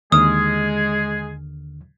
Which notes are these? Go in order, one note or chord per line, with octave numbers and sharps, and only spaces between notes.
D#2 D3 G#3 G#4 D#6 F6